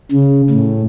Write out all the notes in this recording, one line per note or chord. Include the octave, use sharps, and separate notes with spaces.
C#3
A2